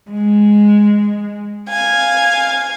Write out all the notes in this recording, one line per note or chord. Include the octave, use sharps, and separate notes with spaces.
G#3
F5 G#5